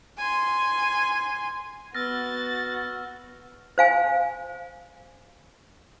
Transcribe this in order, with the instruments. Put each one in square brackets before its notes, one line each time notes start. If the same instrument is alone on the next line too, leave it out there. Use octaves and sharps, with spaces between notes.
[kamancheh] G#5 C6
[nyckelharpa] B3 [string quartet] F#4 [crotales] E6 F6 A#6 [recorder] A6
[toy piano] C5 F5 G#5